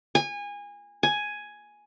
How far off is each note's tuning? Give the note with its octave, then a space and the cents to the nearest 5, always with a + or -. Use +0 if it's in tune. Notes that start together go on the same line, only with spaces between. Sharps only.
G#5 -25
G#5 +5